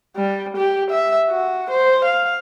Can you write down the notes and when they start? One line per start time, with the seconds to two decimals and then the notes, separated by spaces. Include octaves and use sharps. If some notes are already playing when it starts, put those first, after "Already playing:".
0.16 G3
0.57 G4
0.91 E5
1.29 F#4
1.71 C5
2.05 F5